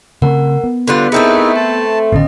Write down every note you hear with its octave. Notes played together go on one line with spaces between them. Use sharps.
C#3 A3 C4 A#4 F#5
B3
D3 G3 F4 B4 F#6
A3 C4 D#4 E4 G#4 A#4 B4
A5 C6
A1 D3 B3 C#4 D#5